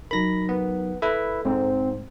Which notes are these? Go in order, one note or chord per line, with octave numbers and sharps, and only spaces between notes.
F#3 D#4 A#4 B5 A#6
B3
E4 A4 B4 E5
G#2 C4